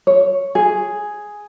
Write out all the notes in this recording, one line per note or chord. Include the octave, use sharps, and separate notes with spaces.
C#5
G#4